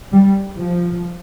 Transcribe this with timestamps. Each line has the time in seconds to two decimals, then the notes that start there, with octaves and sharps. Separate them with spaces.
0.13 G3
0.57 F3